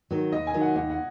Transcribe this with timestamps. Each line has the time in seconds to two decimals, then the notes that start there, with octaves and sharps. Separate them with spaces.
0.11 D#3 F#3
0.32 D#2 D#5
0.47 G#5
0.54 D#3 F#3
0.61 F#5
0.76 D#2 F#5
0.90 F#5